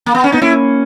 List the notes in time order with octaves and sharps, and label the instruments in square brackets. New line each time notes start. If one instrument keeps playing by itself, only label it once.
[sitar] A#3
B3
C#4
[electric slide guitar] B3 [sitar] D#4
[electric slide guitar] A#3 C#4 [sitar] E4